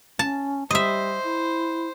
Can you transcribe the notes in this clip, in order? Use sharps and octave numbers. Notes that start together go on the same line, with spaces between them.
C#4 A5
G3 C5 D#5 E5
E4